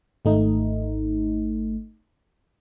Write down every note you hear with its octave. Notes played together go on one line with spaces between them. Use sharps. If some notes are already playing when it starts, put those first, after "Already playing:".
G#1 A3 D#4